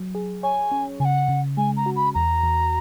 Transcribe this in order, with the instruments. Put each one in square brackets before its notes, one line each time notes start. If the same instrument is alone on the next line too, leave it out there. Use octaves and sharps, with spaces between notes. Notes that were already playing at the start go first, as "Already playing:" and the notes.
Already playing: [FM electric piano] F#3
G#4
[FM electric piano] C#5 [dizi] G#5
[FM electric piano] C#4
[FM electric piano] C#3 [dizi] G#5
[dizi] F#5
[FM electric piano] C#3
[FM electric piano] G#3 [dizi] G#5
[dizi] A#5
[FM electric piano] F#4
[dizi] B5
[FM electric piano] E2 [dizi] A#5
[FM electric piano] E2